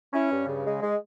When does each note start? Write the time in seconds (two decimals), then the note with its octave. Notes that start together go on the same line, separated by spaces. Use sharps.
0.14 C#4 E4
0.30 G2
0.47 C#3
0.65 G#3
0.81 G#3